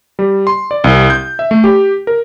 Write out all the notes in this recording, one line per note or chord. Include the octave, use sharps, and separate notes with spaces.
G3
C6
D5
C2
G6
E5
A3
G4
A#4